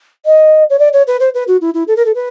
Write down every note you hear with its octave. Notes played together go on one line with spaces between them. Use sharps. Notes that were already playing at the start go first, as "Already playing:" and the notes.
D#5
C#5
D5
C#5
B4
C5
B4
F#4
E4
E4
A4
A#4
A4
B4